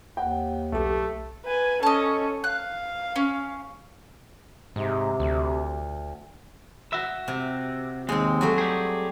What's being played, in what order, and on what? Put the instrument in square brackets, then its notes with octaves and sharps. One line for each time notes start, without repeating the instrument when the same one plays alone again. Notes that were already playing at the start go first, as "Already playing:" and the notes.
[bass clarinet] D#2 [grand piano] F#5 G5
[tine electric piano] B1 G4 [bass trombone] A3
[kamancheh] B4 G#5
[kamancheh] C#4 A4 [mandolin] D#5 A5
[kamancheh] F5 [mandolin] F#6
[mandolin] C#4
[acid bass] G#2 [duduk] C3
[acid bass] D2
[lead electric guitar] F#4 E5
[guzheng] C3
[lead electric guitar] D#2 [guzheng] G#3 C4
[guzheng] F#3 G3 A3
[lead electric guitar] G4 G#4